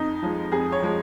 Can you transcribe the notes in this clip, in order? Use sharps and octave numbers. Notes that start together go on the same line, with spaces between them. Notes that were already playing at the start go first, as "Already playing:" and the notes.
Already playing: F2 D#4
F3 G#3
F2 G#4
C#5
F3 G#3